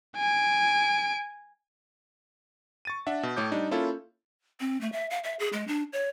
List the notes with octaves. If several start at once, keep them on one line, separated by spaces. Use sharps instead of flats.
G#5 D7
C#6 A6 D#7
D4 E5 F#5
B2
A2 A3 C#5 D6 G6
G3 D4 D#4
A#3 C#4 E4 F4 A4
C4
A3
E5
F5
E5
G#4
G#3
D4
C#5